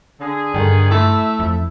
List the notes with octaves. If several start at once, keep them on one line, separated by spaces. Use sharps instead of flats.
D3 G#4
G2 D3 D#3
A3 E4 E5
F2